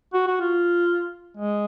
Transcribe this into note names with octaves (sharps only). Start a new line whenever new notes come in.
F#4
F#4
F4
G#3